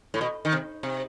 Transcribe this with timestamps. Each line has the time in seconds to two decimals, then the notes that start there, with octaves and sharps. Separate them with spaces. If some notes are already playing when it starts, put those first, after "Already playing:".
0.14 A2
0.21 B2
0.45 D#3
0.53 C3
0.83 C3